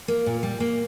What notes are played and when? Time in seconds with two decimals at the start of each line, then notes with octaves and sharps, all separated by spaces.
0.08 A#3
0.26 A#2
0.43 G3
0.60 A#3